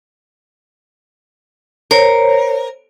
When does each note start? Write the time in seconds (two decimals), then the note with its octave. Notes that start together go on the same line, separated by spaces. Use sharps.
1.91 A#4 C5 C#5